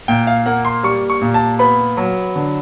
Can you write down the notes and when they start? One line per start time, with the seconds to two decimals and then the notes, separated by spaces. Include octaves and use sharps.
0.08 A#2 G5
0.27 F5
0.46 A#3 F#5
0.65 C6
0.83 G3 C#6
1.10 C#6
1.22 A#2
1.34 A5
1.59 B3 B5
1.97 F#3
2.36 D3